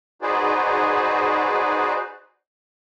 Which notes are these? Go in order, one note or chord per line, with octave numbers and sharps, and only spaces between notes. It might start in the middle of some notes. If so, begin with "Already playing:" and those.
D#4 F#4 G#4 B4 C5 D5